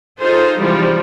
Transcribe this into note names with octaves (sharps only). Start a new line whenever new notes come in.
D#4 F4 G#4 A4 C5
G#2 C3 E3 F3 G3